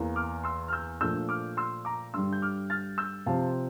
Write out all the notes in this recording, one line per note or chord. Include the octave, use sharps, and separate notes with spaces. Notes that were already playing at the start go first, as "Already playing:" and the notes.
Already playing: E2 E3 A#3
D6 F6
C6 E6
F6
E6 G6
A#2 F3 A3 D4 E6 G6
D6 F6
C6 E6
A#5 D6
G2 D3 G3 C6 E6
G6
D6 F6
F6 A6
E6 G6
C3 F3 C4 F5 A5